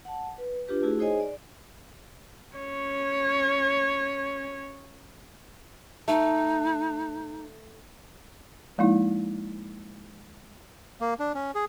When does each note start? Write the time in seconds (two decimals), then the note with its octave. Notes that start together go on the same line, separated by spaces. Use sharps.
0.05 F#5 A5
0.38 B4
0.68 D4 F4 G4 B4
0.83 A3 E4 F#4 G#4
0.99 D#4 G#4 C5 C#5 D#5 G#5
1.20 D5
2.57 C#4 C#5
6.08 A3 D#4
8.78 F3 G#3 A#3 D#4 E4
11.01 A#3
11.20 D4
11.35 C#4
11.55 G#4